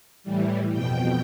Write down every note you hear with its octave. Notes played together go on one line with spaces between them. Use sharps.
A2 E3 G3
F2 B2 G5